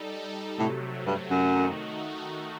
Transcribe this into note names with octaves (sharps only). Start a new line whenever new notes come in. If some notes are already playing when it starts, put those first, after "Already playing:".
Already playing: G3 D#4 A4
A2 C3 F#3 A3
G2
F#2
D#3 A3 D#4 F#4